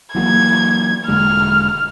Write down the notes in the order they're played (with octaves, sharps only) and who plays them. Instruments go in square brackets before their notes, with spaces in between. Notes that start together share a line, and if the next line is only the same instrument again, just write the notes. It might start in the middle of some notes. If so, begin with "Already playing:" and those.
[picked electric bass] E3 F#3 A#3 [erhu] G#6
[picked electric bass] E1 D3 G#3 [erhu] F6